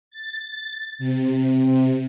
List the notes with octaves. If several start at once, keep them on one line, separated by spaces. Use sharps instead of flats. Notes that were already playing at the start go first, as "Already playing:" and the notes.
A6
C3